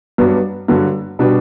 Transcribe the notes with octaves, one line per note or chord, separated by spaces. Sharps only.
G2 F#3 B3 D4
G2 D3 F#3
B2 G3 D4 F#4 B4